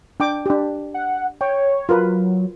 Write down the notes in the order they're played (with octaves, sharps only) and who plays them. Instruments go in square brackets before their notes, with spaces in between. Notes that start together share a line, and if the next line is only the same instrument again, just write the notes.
[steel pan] D4 G5 D6
D4 G4
[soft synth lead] F#5
[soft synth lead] C#5 [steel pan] G5
[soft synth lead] F#3 [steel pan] F4 A#4 B4